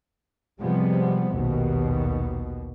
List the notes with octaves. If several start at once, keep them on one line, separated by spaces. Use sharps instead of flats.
C3 F3 G3 G#3 B3 C4
A#1 D#2 B2